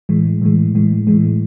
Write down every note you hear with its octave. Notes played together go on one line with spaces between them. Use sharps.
A2 E3 G#3
A2 E3 G#3
A2 E3 G#3
A2 E3 G#3